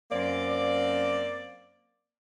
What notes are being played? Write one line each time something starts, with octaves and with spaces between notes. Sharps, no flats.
F#2 A#3 C4 D5